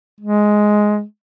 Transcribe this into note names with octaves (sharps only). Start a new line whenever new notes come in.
G#3